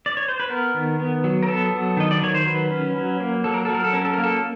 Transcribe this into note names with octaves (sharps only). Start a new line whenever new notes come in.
D5
C#5
C5
B4
B3 A#4
D#3
B3
F#3
A#4
B3 A4
F#3
D#3 D#5
D5
D#3 C#5
C5
F#3 B4
C#4
F#3
A#3
F#3 A4
A#4
F#3 A4
A#4
A4
C#4 A#4
A4
A#3 A#4
A4